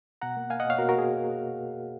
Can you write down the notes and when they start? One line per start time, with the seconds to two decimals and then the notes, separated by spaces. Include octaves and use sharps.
0.21 B2 F#5 A#5
0.37 A#3
0.50 A#3 F5 G#5
0.60 D#5 F#5
0.65 B2
0.70 C#5 F5
0.78 B2 F#4 A#4
0.89 F#4 A#4
0.93 A#3
0.98 G#4